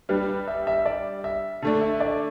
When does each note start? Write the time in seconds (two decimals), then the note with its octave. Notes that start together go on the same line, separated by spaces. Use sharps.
0.09 G3 D4 G4 B4
0.28 B4
0.48 E5
0.67 E5
0.86 D5
1.24 E5
1.62 D3 A3 D4 A5
1.82 E5
2.00 D5